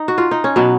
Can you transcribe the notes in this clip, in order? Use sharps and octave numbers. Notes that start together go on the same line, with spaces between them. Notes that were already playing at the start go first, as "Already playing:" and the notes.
Already playing: D#4
F#4
F4
D#4
C#4
B2 F#3 B3